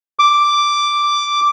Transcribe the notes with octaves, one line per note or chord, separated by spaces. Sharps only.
D6